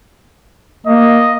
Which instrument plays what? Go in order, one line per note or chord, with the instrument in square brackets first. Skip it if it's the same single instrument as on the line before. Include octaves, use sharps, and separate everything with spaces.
[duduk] A#3 [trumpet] D#5